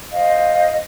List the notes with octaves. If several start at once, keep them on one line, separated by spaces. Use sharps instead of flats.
C5 D#5 F5